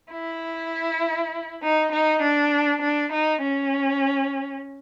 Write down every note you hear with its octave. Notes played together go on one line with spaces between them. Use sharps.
E4
D#4
D#4
D4
D4
D#4
C#4